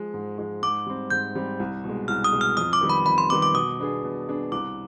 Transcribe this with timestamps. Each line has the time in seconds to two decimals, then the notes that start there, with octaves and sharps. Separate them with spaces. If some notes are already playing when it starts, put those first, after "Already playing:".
Already playing: F3 G#3
0.14 G#2
0.38 F3 G#3
0.62 G#2 D6
0.87 G3 C4
1.10 G#2 G6
1.35 G3 C4
1.60 C2
1.84 B2
1.89 G#3
2.08 C2 F6
2.24 D#6
2.33 B2 G#3
2.41 F6
2.57 F2 D#6
2.73 D6
2.81 D#3 G3 B3
2.90 B5
3.06 F2 B5
3.18 C6
3.30 D#3 G3 B3 D6
3.42 D6
3.54 B2 D#6
3.79 B3 D4 G#4
4.03 B2
4.28 B3 D4 G#4
4.52 C2 D6